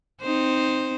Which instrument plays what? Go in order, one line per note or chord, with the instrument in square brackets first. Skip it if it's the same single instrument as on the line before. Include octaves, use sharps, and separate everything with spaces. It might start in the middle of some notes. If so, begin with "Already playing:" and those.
[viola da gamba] C4 D#4 C5